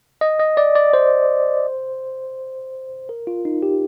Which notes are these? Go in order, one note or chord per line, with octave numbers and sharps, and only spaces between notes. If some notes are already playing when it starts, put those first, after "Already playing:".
D#5
D#5
D5
D5
C5
A#4
F4
D#4
G4